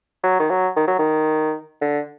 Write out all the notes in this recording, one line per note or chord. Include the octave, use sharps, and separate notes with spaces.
F#3
D#3
F#3
D#3
F#3
D#3
D3